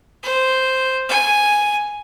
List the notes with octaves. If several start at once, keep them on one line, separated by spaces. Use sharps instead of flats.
C5
G#5